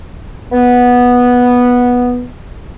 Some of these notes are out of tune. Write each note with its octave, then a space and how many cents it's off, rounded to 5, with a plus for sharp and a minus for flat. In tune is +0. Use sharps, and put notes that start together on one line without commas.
B3 -10